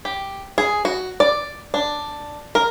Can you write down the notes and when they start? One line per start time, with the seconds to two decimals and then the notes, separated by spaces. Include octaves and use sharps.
0.05 G4
0.58 G#4
0.85 F#4
1.20 D5
1.74 D4
2.55 A#4